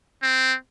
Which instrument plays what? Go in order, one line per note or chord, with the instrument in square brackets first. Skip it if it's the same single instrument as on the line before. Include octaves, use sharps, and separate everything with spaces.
[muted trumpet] C4